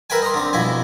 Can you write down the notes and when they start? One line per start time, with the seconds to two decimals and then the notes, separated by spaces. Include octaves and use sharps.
0.10 A#4 B4 E5 G5 G#5
0.22 D#5 A#5 C6
0.34 D3 C4
0.53 F2 B2 E4 G#5